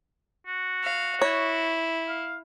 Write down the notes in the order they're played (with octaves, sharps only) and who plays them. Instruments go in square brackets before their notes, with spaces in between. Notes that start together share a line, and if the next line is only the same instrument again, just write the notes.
[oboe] F#4
[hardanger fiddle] F5
[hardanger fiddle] E4 [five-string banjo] C#5
[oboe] F5